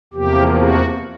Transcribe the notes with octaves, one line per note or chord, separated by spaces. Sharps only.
E2 C3 F3 A#3 G4
F#4